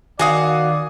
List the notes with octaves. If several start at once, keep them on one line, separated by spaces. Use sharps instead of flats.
D#3 F#4 D5 F5 F#5 G#5 D#6